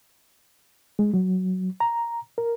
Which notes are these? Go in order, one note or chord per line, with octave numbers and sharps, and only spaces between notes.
G#3
F#3
A#5
A#4